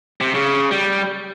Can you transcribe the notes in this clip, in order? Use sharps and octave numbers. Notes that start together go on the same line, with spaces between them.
C3
C#3
G3